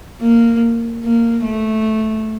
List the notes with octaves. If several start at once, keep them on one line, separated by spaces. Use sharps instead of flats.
A#3
A#3
A3